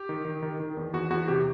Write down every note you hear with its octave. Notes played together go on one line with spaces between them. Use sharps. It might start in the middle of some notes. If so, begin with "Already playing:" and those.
Already playing: G4
D#3
D#3
D#3
D#3
E2
E2 F#4
E2 F#4
C3 G4